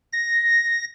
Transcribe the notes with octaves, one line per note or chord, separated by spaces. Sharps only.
A#6